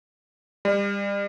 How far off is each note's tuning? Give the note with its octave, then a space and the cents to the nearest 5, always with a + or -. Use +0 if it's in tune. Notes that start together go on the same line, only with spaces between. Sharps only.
G3 +35